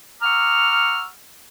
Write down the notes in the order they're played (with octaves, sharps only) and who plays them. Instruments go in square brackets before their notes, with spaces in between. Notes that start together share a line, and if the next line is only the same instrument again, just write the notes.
[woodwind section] F#5 A#5 C#6 D6 E6 F6